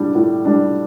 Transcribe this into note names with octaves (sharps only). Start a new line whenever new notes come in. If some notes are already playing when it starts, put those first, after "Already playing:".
Already playing: A2 G3 D4
A2
G3 D4